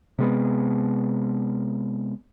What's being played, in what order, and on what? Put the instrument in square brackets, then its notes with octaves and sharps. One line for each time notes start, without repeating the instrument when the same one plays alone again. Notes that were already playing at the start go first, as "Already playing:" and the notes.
[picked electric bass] C3 G#3 B3